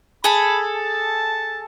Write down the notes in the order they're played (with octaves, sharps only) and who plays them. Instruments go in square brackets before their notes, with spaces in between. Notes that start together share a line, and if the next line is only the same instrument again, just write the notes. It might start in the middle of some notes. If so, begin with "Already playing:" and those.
[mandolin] G#4 A4 [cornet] B5
[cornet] A5